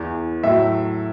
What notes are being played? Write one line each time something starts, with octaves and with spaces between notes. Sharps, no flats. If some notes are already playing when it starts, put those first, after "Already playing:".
Already playing: E2 E3
A2 F#3 E5